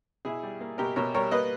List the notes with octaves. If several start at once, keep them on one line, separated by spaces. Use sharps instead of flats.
B2 E4 G#4
G3
A#3
B2 G4 A#4
B2 A#4 C#5
G3 A#4 C#5
A#3 B4 D#5